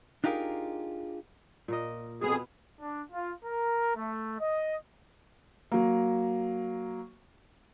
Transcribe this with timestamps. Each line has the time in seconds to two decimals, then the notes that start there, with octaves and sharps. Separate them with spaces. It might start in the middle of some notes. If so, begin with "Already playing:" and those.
0.24 D4 D#4 F4 G4 G#4 A#4
1.68 A#2 A#4 D#5
2.21 F2 B2 B3 G#4
2.80 D4
3.13 F4
3.44 A#4
3.96 A3
4.40 D#5
5.72 F#3 A#3